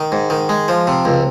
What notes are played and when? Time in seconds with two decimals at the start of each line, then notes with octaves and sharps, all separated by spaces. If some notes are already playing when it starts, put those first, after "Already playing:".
Already playing: D#3
0.12 G#2
0.30 D#3
0.49 G#3
0.68 F3
0.87 C3
1.05 C#2